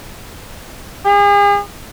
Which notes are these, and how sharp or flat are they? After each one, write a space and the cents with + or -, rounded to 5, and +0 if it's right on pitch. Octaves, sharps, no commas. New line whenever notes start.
G#4 -40